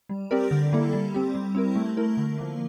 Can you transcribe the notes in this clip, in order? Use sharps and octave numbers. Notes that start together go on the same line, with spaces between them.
G3
C4 G4 A#4 D5
D3
G3 A#3 E4 A4
G3
C4 G4
G3
C4 E4 A#4
A3
E4 A#4
D3
F3 A#3